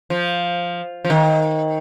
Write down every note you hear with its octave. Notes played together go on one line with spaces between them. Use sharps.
F3
F3
D#3